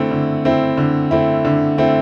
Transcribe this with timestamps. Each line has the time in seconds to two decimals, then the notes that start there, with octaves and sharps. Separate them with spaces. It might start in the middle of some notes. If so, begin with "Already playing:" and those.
Already playing: D3 A3 C4 E4
0.11 D3
0.45 A3 C4 E4
0.77 D3
1.11 A3 C4 E4
1.45 D3
1.78 A3 C4 E4